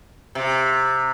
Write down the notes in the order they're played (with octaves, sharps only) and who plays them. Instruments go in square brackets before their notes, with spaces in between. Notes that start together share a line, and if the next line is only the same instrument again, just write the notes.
[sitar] C3